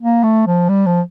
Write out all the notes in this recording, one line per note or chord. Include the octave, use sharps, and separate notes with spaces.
A#3
A3
F3
G3
F3